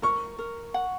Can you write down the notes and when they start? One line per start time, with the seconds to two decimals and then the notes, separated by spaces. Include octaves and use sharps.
0.02 A#4 C#6
0.39 A#4
0.74 F#5